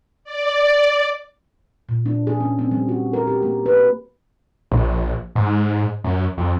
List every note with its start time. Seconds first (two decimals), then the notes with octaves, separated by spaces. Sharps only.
0.24 D5
1.89 A#2
2.06 D4
2.27 G#4
2.40 C#4
2.59 C4
2.71 G3
2.89 F#4
3.13 A#4
3.27 G4
3.42 A#3
3.66 B4
4.72 A#1
5.35 G#2
6.04 F#2
6.38 F2